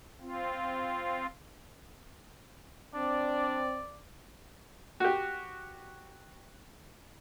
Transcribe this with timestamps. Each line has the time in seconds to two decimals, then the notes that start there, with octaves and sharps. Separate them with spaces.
0.21 C4 F4
2.94 C4 D4 D5
5.00 F#4 G4